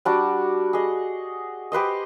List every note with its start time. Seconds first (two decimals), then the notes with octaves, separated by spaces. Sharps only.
0.05 G3 D4 F#4
0.73 G#4 D#5
1.72 G4 B4 C5 D#5